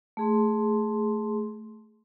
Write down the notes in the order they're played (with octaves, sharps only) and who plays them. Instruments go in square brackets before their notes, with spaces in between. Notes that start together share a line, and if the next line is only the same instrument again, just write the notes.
[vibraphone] A3 G#4 C6